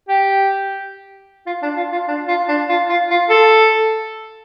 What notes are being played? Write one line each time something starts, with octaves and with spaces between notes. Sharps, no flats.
G4
F4
D4
F4
F4
D4
F4
D4
F4
F4
F4
A4